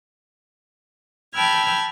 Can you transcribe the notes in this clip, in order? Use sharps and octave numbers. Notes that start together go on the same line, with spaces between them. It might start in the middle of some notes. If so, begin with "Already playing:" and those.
G5 A5 B5 E6 F6 G#6